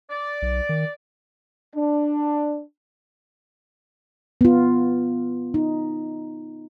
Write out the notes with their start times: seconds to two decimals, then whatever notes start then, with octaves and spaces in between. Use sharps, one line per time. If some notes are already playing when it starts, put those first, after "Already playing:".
0.10 D5
0.42 B1
0.69 D#3
1.75 D4
4.41 B3 F4
5.54 D#4